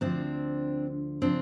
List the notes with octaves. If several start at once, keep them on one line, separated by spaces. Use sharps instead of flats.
D2 D3 F3 C4 D4
C#3 F3 C4 D4